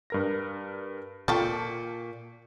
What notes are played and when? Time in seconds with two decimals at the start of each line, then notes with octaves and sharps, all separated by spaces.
0.10 G2 A#4 A#6
1.28 A#2 F4 A4 G5 C#6 G6